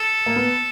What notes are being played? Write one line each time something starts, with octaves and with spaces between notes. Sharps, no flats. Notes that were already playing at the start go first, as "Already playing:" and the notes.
Already playing: A4
A#3
B3